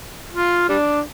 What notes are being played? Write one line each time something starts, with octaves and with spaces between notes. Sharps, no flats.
F4
G3 D4